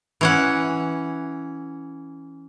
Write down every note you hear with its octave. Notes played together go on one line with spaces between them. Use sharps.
E3 C#4 F#5